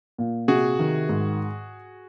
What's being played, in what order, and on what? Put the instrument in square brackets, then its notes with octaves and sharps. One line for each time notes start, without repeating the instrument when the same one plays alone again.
[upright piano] A#2
[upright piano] C3 [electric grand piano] F#4 G#4
[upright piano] D#3
G#2